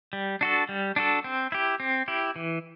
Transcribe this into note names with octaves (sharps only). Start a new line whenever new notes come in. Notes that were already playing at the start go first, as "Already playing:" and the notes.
G3
D4 F#4 A4
G3
D4 F#4 A4
C4
E4 G4
C4
E4 G4
E3